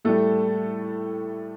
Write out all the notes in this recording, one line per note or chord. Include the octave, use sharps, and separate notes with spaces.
A2 G3 A3 A4